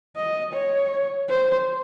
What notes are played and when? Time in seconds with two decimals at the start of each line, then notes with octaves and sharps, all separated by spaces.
0.16 D#5
0.52 C#5
1.29 C5